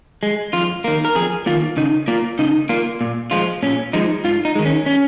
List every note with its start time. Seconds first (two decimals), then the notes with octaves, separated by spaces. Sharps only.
0.23 G#3
0.53 F2 F4
0.84 D#3 A#3
1.05 A#4
1.15 F2 G#4
1.46 D#3 A#3 F4
1.77 C#3 D#4
2.08 A#3 F4
2.39 C#3 D#4
2.69 A#3 F4
3.01 A#2
3.31 F3 G#3 F4
3.63 A#2 C#4
3.93 F3 G#3 D#4
4.24 G#2 F4
4.45 D#4
4.55 D#3 G#3
4.65 C#4
4.86 C#4